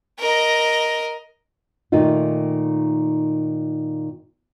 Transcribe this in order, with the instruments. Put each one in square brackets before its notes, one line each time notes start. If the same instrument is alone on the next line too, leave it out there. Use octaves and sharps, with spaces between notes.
[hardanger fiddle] A#4 D#5
[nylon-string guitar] A#2 D#3 A3 D#4 F4